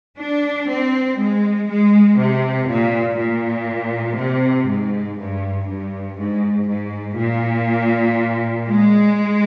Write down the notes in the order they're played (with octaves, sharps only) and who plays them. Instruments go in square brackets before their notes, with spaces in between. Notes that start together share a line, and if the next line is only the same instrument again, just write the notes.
[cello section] D4
C4
G#3
G#3
C3
A#2
A#2
C3
G#2
G2
G2
G#2
G#2
A#2
G#3